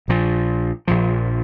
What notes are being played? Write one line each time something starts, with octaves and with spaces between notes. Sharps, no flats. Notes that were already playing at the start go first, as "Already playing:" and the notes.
A#1 A#2 F3
A#1 A#2 F3